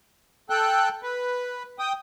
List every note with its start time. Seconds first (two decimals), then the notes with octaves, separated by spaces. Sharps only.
0.50 A4 G5 F#6
1.03 B4
1.79 G5 D#6